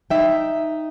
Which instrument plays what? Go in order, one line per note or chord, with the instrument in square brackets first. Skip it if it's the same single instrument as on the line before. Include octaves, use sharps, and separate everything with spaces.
[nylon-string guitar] D#4 E5 G5